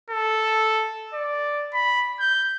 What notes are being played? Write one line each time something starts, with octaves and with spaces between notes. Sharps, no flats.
A4
D5
B5
G6